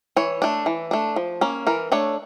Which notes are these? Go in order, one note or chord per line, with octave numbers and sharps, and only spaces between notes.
E3 C#5
A3 D4
E3
A3 D4
F3
A#3 C#4
E3 A#4
A3 D4 C#5